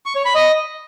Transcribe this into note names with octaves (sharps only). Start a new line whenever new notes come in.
C#6
C#5
B5
D#5